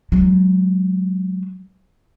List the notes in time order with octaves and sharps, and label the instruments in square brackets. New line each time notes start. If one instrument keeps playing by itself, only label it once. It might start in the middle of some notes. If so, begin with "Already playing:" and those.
[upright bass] F#3 G#3